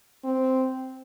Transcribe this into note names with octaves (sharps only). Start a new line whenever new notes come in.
C4